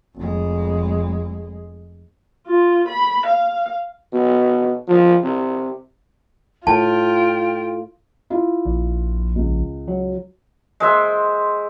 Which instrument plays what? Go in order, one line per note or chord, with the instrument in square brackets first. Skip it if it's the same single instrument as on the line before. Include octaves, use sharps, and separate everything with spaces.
[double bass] F1 G#3
[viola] F4
B5
F5
[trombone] B2
F3
C3
[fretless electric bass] A2 [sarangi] F4 [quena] G5 [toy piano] A5
[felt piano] E4 F4
[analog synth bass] A#1
[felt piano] C#2
[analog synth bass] F#3
[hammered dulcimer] G#3 C5 E5